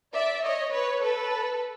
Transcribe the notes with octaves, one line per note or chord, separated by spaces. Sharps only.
D5 E5
C#5 D#5
B4 C#5
A4 B4